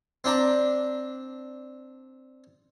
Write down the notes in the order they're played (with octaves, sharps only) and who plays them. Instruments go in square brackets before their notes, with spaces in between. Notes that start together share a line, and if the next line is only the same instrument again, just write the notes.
[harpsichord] C4 D4 A#5